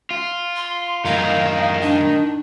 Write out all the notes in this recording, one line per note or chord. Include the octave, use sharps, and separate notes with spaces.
F4
C6
F#2 A2 D#4 A#4 F5
D4